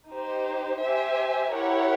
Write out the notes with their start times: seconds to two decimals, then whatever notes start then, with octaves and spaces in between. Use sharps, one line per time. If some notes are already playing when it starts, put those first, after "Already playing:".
0.11 D#4 G4 C5
0.81 G4 C5 E5 G#5
1.53 E4 G4 A#4 C#5 F#5